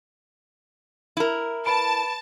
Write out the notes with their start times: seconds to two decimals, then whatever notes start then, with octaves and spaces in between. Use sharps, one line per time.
1.17 E4 A#4
1.66 B4 A5 B5 D7